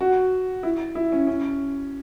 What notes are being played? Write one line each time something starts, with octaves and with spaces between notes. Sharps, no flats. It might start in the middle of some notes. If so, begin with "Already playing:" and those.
F#4
E4
E4
C#4
C#4